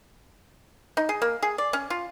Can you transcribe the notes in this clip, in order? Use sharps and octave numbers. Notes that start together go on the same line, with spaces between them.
D#4
G#4
A#3
G#4
D5
C#4
F4